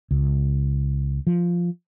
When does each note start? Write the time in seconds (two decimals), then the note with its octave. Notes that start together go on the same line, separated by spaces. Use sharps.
0.11 C#2
1.27 F3